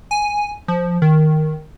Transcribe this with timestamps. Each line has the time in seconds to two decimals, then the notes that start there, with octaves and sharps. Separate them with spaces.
0.11 G#5
0.68 F3
1.02 D#3